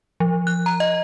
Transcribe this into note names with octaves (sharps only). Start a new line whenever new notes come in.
F3
F#6
A#5
D#5